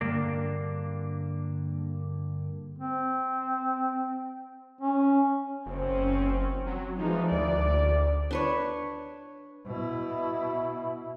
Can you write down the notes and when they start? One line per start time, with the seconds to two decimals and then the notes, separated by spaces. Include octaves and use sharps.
0.01 G2 D3 A#3 D4
2.78 C4
4.81 C#4
5.66 F#1 C4 C#4
6.66 F#3
6.98 E3 F3 G#3 D#4
7.31 D2 D5
8.31 D4 B4 C#5
9.66 B2 E4